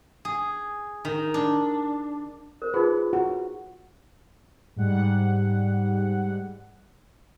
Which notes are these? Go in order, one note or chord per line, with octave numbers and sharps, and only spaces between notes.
G#4
D#3
D4
A#4 C5
D#4 F4 G#4 B4
F#4
G#2 G3 F#5